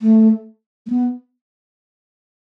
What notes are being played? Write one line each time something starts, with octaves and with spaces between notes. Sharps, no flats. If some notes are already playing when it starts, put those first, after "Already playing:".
A3
A3
B3